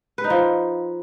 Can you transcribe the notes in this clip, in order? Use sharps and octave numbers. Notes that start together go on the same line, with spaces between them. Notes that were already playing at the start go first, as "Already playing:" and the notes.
B4
D#4
F3